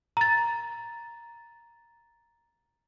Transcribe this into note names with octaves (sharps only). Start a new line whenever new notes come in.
A#5 A6